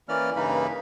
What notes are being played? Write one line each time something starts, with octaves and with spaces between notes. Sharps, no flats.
E3 A#3 C#4 D5 F6
G2 C#3 E3 A#3 D#4 B5